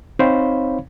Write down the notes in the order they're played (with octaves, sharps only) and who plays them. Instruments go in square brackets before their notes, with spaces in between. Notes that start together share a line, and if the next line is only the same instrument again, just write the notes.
[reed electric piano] C4 D#4 C5 C#5 F5 B5